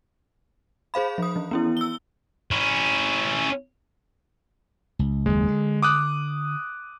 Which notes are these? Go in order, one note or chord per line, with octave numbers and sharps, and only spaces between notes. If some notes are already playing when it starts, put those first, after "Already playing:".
G#4 C5 F5 B5
F3 D#6
E3
B3 C#4 E4
E6 G7
C#4 E4
C#2
F#1 D#2 G#3
D3
D6 D#6 F#6